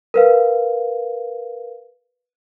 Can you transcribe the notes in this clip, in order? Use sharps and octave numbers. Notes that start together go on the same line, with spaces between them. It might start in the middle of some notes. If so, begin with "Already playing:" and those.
A#4 B4 F5